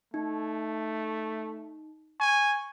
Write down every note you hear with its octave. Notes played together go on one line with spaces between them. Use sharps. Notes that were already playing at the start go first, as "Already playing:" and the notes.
A3 D#4
G#5 C#6